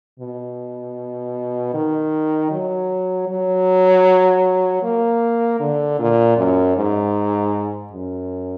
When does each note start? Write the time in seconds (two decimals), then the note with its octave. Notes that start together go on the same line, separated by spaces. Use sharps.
0.20 B2
1.74 D#3
2.51 F#3
3.28 F#3
4.83 A#3
5.60 D3
5.99 A#2
6.37 F#2
6.76 G#2
7.93 F#2